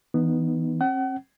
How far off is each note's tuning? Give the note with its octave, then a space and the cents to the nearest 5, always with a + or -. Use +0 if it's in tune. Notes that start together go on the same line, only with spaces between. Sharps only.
E3 -20 B3 +0 D#4 +0
C4 +45 F#5 +40